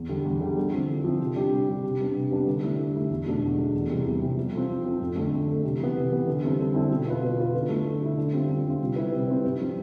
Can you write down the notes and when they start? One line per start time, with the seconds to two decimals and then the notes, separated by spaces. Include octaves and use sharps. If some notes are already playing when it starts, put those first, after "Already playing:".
Already playing: E2
0.09 D3 G3
0.25 E2
0.41 D3 G3
0.57 D3
0.73 F3 C4 E4
0.89 D3
1.04 F3 C4 E4
1.20 C3
1.36 G3 D4 G4
1.52 C3
1.68 G3 D4 G4
1.84 C3
1.99 G3 B3 D4
2.15 C3
2.31 G3 B3 D4
2.47 D3
2.63 A3 E4 G4
2.78 D3
2.94 A3 E4 G4
3.10 E2
3.26 B2 A3 D4
3.42 E2
3.58 B2 A3 D4
3.74 E2
3.89 C3 E3 G3
4.05 E2
4.21 C3 E3 G3
4.37 F3
4.53 C4 F4 A4
4.69 F3
4.85 C4 F4 A4
5.01 F2
5.16 D3 A3
5.32 F2
5.48 D3 A3
5.63 C3
5.79 E3 B3
5.96 C3
6.11 E3 B3
6.27 D3
6.43 G3 C4 E4 A4
6.59 D3
6.74 G3 C4 E4 A4
6.91 B2
7.06 B3 F4 B4
7.22 B2
7.38 B3 F4 B4
7.54 D3
7.69 A3 E4
7.85 D3
8.01 A3 E4
8.18 D3
8.33 G3 C4 F4
8.49 D3
8.65 G3 C4 F4
8.81 C3
8.96 G3 C4 E4 B4
9.13 C3
9.28 G3 C4 E4 B4
9.44 G2
9.60 F3 C4 E4